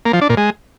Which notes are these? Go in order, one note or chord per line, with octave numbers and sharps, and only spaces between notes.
A#3
F3
D4
A#2
G#3